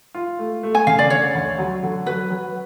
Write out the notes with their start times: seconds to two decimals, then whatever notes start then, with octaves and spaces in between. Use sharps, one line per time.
0.14 F4
0.39 A3
0.63 A3
0.75 G#5
0.87 C#3 F5
0.99 D5
1.10 D3 C#5
1.35 D2
1.58 F#3
1.83 D3
2.06 F#3 B4
2.31 F#3